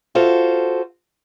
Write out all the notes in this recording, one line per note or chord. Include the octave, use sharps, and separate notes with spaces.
F4 F#4 A4 C5